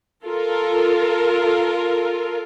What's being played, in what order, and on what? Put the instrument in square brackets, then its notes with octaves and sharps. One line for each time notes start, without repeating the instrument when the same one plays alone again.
[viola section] F4 A4 A#4